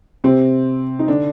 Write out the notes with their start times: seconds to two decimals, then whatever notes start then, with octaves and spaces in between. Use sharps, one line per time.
0.24 C3 C4
0.99 D#4
1.08 D3 D4